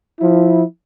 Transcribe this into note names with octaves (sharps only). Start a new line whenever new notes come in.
F3 E4